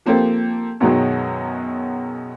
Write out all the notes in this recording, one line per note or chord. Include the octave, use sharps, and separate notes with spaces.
F3 A#3 C4 G4 A4
F#2 B2 D#3 F#3 G#3